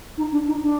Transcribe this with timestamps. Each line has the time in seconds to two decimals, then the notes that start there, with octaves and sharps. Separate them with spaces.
0.17 D#4
0.32 D4
0.48 D#4
0.62 D4